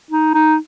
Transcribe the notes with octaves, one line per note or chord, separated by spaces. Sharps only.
D#4
D#4